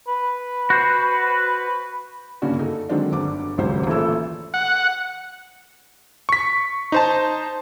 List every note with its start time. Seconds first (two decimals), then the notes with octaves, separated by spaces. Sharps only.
0.08 B4
0.70 F#4 C5
2.42 G2 C#3 A#3 C#4 D4 F#4
2.59 D#4 A4
2.89 D3 D#3 F#3 G#3 C4 D4
3.12 G1 D3 D6
3.57 D#1 G#1 C#2 F#3 C5
3.87 A1 A#2 E3 A4 E6
4.54 F#5
6.29 C#6 B6
6.92 D#4 C5 A5